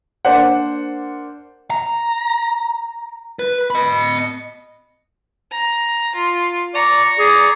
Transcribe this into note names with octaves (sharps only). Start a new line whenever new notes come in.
A#3 D4 C5 F#5
A#5
B4
D#5 B5
A#5
F4
D5 A#5 C#6
G#4 D5